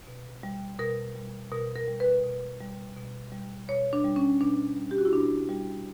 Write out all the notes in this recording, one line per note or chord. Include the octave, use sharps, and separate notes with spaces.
B2
G3
B2 A#4
G3
B2 A#4
A#4
G3
B4
B2
G3
B2
G3
B2 C#5
D4
G3
C#4
B2 D4
G3
G4
F#4
E4
B2 D4
G3